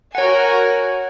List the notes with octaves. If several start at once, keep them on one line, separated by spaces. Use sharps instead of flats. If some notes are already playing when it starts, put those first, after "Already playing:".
F#4 A#4 C#5 F#5 G#5